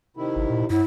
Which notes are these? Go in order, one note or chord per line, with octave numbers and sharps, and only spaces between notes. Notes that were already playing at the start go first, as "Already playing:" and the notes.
C3 D#3 E4
G#1
A#2
G2 E4